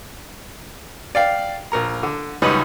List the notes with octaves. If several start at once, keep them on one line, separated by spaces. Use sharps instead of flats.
D5 F5 G5
A#1 A#4 A#5
D3
C#2 F#2 G3 C#4 D#4 B4